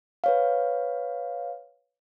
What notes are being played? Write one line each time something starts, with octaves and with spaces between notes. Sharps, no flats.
B4 C#5 F5